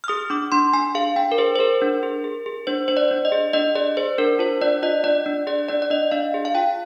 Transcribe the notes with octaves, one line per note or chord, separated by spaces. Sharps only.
F6
G#4 D#6
D4 D6
D4 C6
D4 G#5
G#4 F5
D4 G5
A#4
G#4 C5
C5
G#4 A#4
D4
G#4
G#4
G#4
D4 C5
D4 C5
D5
D4
D#5
G#4
D4 D#5
G#4 D5
G#4 C5
D4 A#4
F4 C5
D4 D5
F4 D#5
D4 D5
D4
G#4 D5
D4 D5
D5
D4 D#5
D4 F5
G#4
F5
F4 G5